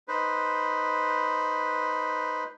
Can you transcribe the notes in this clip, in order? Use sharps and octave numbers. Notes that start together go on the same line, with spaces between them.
D#4 B4 C5